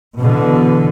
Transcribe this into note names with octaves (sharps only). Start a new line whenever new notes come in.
B2 D3 E3